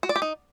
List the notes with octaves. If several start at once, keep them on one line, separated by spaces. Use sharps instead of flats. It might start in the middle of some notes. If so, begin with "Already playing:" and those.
F#4
D5
G4
D#4